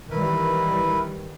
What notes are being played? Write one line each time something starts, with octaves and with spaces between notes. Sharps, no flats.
D#3 E3 G3 E4 A#4 B4